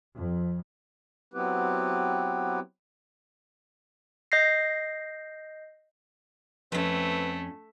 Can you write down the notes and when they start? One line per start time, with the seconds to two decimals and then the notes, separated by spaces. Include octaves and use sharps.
0.16 F2
1.34 F#3 B3 C4 E4 G4 B4
4.32 D#5 G6 A#6 C7
6.72 F2 A3 C4 C#4 B4